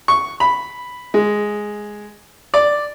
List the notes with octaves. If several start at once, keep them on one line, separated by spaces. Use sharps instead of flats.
C#6
B5
G#3
D5